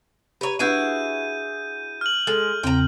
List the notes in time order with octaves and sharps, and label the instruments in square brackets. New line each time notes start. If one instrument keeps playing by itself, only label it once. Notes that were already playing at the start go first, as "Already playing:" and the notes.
[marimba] G4 A#5 [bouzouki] B4 C#5
[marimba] D4 B4 E5 [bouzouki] E4 F#4 G#4 [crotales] G6 D#7
[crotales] F6 F#7
[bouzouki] G#3 [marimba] A4
[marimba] E2 C#3 C4 [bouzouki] G5 A#5